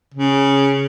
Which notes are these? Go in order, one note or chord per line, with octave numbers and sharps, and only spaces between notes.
C#3